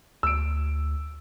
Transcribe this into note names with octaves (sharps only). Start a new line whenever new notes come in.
D2 E6 D7